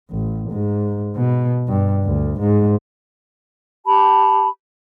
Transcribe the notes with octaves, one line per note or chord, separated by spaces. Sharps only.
A1
G#2
B2
G2
D2
G#2
G4 A5 B5